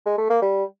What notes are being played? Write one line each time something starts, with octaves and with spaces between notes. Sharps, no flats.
G#3
A3
A#3
G3